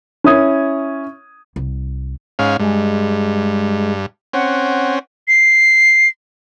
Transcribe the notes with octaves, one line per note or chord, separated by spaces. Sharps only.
C#4 E4 D#6 G#6
C2
G#2 C#4 F5
G2 G#3
C4 C#4 F#5
C7